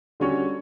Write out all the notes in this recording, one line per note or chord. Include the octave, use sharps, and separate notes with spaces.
D3 G3 C#4 F#4 C#5